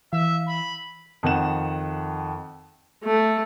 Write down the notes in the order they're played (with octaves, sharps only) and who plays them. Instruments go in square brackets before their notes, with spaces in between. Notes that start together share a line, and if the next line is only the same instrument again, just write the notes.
[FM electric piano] E3 F5 [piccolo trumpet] E5
[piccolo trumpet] B5
[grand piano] F2 D#3 F#5 E7
[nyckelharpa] A3